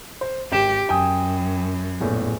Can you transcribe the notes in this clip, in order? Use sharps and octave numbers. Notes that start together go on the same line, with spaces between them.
C5
G#1 G4 G5 E7
F#2 G5 G#5 D#6
A#1 E2 A2